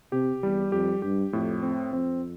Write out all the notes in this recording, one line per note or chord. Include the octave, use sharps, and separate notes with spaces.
C3 G4
E2 G3
F2 G4
G2 G4
F2 A2
C4
F2 C4